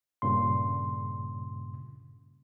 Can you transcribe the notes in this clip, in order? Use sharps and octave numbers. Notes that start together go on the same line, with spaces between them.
G2 A#2 C#3 C6